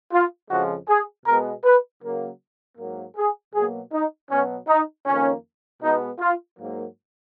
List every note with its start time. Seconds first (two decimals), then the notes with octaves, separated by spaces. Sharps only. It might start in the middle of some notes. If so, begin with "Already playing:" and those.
0.12 F4
0.50 F2 C#3 F3 G#3 F#4
0.88 G#4
1.26 B2 G#3 B3 A#4
1.64 B4
2.02 C#3 F#3 A#3
2.78 G#2 F#3 A#3
3.17 G#4
3.54 B2 F#3 A#3 G#4
3.93 D#4
4.30 B2 F#3 B3 C#4
4.68 D#4
5.06 F2 D#3 A#3 C#4
5.82 B2 G#3 B3 D#4
6.20 F4
6.59 G#2 F#3 A#3